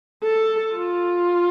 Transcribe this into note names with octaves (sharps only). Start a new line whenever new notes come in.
A4
F4